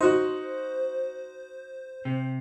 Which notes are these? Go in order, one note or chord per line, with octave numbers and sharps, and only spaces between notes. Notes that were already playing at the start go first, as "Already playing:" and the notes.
D#4 F#4 C5
C3